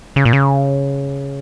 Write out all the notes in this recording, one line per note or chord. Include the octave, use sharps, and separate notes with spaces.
C#3
A#2
C#3